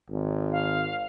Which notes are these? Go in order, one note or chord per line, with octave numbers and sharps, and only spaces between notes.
G#1
F5